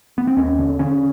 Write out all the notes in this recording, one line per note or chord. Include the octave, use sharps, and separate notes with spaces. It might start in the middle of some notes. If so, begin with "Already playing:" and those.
B3
C4
D#2 C#4
D3
D3 C#4